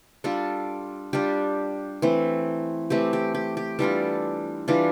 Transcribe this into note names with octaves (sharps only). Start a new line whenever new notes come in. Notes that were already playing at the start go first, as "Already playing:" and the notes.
G3 D4 F4 A4
G3 D4 F4 G4
E3 A3 C4
E3 A3 C4 G4
G4
G4
G4
E3 G3 D4 F4 A4
E3 G3 D4 F4